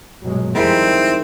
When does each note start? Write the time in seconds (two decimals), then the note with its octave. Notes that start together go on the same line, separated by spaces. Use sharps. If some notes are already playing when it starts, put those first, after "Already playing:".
0.22 G1 B2 F#3 G#3
0.55 F2 D#3 G3 G#3 C4 E4